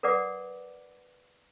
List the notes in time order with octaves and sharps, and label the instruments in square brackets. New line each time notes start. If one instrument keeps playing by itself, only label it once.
[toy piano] A#4 B4 D5 F#5 D6